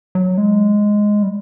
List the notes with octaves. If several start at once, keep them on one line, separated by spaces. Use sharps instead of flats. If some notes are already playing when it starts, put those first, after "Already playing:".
F#3
G#3
G3